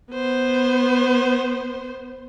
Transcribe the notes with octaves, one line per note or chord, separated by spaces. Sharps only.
B3 C5